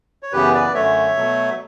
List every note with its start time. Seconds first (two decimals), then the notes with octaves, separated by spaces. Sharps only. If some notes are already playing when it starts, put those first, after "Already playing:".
0.23 C#5
0.32 F#2 C#3 E3 B3 G4 B4
0.54 B4 D5
0.74 F#2 D3 A3 C#5 E5
1.16 B2 F#3 A3